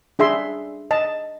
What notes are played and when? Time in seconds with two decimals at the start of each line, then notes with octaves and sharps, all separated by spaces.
0.19 D4 G#4 E5 C6
0.91 D#5 A5